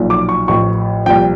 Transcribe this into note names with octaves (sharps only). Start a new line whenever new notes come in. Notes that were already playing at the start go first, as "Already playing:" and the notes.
Already playing: B1 A#2 F3
D6
C#6
A1 A2 F3 C#6
C2 A#2 F3 G5